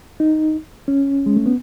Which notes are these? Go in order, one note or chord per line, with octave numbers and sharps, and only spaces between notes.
D#4
C#4
G#3
A3
B3